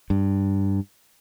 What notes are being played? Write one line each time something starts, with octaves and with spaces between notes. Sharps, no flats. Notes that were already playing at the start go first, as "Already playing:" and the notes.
G2